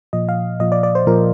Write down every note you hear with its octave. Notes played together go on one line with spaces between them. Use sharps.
A#2 F3 D#5
F5
A#2 F3 D#5
D5
D5
C5
A#2 F3 A#4